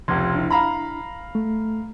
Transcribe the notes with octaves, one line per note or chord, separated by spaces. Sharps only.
F1 C#2 C6 G#6
D4 E4
F5 A#5 B5
A3